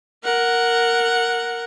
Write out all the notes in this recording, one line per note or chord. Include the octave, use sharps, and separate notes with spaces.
A#4 F#5